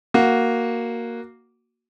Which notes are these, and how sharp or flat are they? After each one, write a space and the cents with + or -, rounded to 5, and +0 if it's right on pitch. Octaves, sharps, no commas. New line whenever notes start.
A#3 +0 F#4 +0